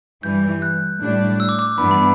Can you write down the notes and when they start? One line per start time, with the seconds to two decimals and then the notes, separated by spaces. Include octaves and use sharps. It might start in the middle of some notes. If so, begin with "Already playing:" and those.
0.23 G2 E3 G3 G6
0.62 F#6
1.01 A2 G3 D4
1.40 E6
1.49 D6
1.59 D6
1.78 G2 E3 B3 D4 B5
1.91 B5